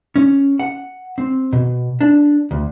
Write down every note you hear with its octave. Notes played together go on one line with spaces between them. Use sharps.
C#4
F#5
C4
B2
D4
D2